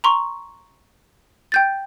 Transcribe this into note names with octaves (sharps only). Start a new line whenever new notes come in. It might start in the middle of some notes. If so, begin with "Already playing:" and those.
A#5 C6 C#6
G5 G6 A6